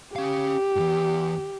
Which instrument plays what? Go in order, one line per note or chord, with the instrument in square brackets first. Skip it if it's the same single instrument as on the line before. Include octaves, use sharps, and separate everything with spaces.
[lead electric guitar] C#4 F5 [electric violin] G4
[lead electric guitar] E2 G2